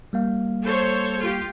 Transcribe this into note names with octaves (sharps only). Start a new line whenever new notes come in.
G3 A#3 F5
A4 C5 C#5
F4 G4